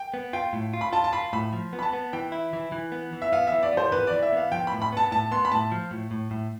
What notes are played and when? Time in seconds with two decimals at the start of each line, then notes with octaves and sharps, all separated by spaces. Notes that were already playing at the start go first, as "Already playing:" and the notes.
Already playing: G5
0.14 B3
0.33 F4 G5
0.53 A2
0.73 F4
0.81 B5
0.93 F4 A5
1.04 A5
1.13 F4 B5
1.33 A2 B5
1.53 F3
1.73 B3
1.79 B5
1.83 A5
1.93 B3
2.13 E3 G5
2.32 E4
2.53 E3
2.72 E3
2.92 B3
3.13 E3
3.22 E5
3.33 B3 F5
3.47 E3 E5
3.63 D5
3.72 B3
3.77 C5
3.92 E3 B4
4.07 D5
4.13 E3
4.22 E5
4.33 B3 F5
4.52 F3 G5
4.67 A2 B5
4.82 B5
4.92 B3 A5
5.11 A2 A5
5.31 B3 C6
5.45 B5
5.52 A2 A5
5.72 F3
5.91 A2
6.11 A2
6.31 A2